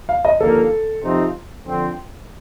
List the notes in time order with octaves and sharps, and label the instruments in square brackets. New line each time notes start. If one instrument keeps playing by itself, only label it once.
[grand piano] F5
D#5
[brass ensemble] D#2 D3 F3 A#3 [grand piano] A4
[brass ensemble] F2 C3 F3 C4 D#4
F2 D3 F3 C4